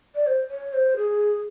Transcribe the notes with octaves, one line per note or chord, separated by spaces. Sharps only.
D5
C5
C#5
C5
G#4